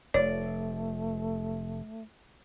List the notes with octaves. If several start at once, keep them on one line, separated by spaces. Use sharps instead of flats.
F1 A3 C#5 D5